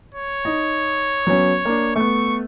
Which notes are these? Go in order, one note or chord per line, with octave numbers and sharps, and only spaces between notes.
C#5
D#4
F#3 B3 C#4
A#3 D4
A3 B3 C#6